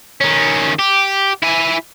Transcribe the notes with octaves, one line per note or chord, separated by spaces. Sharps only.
D#3 C#4
G4
E4 G#5